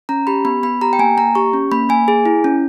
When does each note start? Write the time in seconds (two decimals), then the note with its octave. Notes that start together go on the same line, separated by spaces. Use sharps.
0.09 C#4 A#5
0.27 G4 B5
0.45 B3 B5
0.63 B3 B5
0.81 G4 A#5
0.93 G5
0.99 A#3 G#5
1.17 A#3 A#5
1.35 G4 C#6
1.53 C#4
1.71 A#3 B5
1.89 A#3 G#5
2.08 G#4
2.26 E4
2.44 C#4